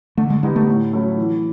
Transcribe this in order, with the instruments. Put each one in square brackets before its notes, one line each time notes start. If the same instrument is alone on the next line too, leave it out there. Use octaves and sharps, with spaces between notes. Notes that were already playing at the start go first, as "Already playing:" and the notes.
[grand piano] D3 [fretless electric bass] A3
[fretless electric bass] G#3
[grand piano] G3 B3 D#4 [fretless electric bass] G#3
[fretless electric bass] A3
[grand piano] A2
F#3 A3 C#4 E4
E3